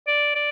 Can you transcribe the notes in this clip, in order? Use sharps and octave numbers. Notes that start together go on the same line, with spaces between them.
D5
D5